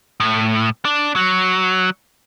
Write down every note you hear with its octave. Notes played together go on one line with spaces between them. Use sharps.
A2
D4
F#3